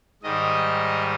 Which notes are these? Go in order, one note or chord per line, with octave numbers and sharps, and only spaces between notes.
G#2 D#3 G3 D#5